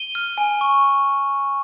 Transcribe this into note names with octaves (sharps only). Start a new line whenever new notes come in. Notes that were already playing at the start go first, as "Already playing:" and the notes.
Already playing: D#7 G7
F6
G#5
C#6